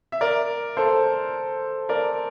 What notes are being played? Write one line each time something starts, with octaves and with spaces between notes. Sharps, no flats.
E5
A#4 D5
A4 C5
A#4 D5